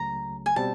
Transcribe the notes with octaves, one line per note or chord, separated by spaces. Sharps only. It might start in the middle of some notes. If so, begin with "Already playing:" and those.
Already playing: C#2 C#3 F#3 A3 A#5
G#5
B2 G3 C4 A5